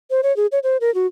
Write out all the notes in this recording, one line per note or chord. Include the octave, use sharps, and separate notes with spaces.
C5
C#5
G#4
C#5
C5
A#4
F#4